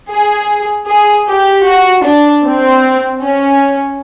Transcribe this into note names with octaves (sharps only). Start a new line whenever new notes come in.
G#4
G#4
G4
F#4
D4
C4
C#4